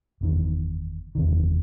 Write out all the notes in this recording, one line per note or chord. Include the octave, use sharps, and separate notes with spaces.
F#1 E2 C3 D#3
F#1 E2 C3 D#3